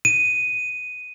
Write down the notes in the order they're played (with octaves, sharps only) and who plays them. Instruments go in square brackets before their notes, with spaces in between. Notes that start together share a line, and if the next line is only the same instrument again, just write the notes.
[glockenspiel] D#7